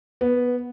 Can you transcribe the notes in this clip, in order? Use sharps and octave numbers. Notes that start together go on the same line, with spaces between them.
B3